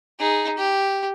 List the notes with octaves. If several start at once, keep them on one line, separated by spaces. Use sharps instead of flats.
D#4 G#4
G4